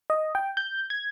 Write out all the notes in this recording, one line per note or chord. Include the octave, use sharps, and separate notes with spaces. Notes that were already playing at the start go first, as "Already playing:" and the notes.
D#5
G5
G6
G#6